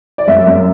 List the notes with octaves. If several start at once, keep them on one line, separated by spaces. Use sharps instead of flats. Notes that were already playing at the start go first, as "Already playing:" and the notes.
D5
F#2 E5
F#2